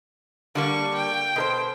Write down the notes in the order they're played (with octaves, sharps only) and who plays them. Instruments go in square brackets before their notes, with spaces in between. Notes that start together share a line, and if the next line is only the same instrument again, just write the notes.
[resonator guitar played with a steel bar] D3 G3 A#3 [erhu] C#6
[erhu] G5
[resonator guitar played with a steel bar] B2 A#4 C5